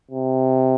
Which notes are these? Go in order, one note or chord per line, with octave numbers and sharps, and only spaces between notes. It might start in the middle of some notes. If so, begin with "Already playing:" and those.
C3